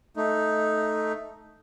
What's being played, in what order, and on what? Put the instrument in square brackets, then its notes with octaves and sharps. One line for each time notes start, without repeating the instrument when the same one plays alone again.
[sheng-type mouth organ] A3 D#4